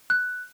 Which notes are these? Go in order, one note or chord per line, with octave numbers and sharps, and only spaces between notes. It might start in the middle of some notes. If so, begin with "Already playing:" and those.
F#6